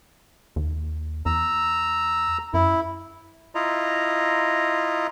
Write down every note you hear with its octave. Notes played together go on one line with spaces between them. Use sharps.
D#2
E2 A#5 E6
F#2 E4
E4 F4 D#5 A#5